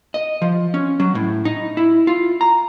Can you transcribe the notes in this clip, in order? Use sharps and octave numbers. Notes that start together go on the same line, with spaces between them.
D#5
F3
C#4
F#3
A2
D#4
E4
F4
A#5